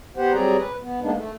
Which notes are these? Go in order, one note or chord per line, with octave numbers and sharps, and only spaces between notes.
B3 G4 C5 F#5
F#3 G3 C4 G#4 D5 A#5
B4
B3
G#3 A#3 B3 D4 D#4
A3